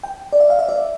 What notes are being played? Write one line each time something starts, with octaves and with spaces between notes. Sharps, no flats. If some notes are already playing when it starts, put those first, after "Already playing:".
G5
D5
E5
F5
E5
D5